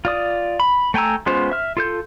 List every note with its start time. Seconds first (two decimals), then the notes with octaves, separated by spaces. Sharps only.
0.05 F4 D5 D#6
0.60 B5
0.94 A3 G5 G#5 A#5 E6
1.26 G#3 B3 C#4 F4 C5
1.52 E5 F6
1.77 F4 A4 G6